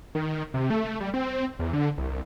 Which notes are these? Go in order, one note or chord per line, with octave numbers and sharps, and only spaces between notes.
D#3
C3
A3
G3
C4
E2
D3
C2